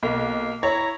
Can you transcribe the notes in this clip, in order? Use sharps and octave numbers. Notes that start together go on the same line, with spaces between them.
B1 A#3
E4 C#5 A#5